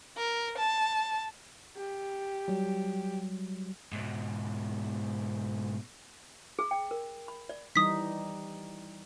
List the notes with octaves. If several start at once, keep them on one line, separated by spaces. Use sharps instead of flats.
A#4
A5
G4
F#3 G3
G#2 B2
G#4
G5
A#4
B5
D5
E3 G3 D#4 D#6 B6